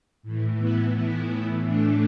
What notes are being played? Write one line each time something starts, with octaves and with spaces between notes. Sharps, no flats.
A2 E3
B3 E4
B3 E4
A3 D4